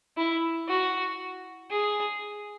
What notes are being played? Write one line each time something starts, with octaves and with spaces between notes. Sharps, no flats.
E4
F#4
G#4